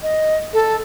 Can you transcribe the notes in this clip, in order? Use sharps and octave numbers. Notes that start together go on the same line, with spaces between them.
D#5
A4